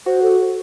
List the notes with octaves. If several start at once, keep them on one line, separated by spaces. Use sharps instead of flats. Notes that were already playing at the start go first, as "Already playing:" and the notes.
F#4 C5
A4